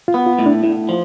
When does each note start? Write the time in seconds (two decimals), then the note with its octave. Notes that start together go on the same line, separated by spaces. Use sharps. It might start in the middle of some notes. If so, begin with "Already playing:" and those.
0.08 F4
0.14 B3
0.26 F4
0.39 A2
0.46 D4
0.64 A2 E4
0.89 F3